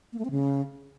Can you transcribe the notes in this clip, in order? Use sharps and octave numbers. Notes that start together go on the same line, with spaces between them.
A#3
A3
C4
C#3